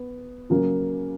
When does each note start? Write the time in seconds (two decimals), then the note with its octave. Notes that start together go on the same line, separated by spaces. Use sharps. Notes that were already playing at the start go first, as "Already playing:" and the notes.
Already playing: B3
0.50 C#3 F#3 A#3